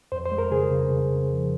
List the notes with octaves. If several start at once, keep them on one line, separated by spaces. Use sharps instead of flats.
F2 C5
C5
G#3
A#4
C#3 G#4
C#3
C#3
C#3
F3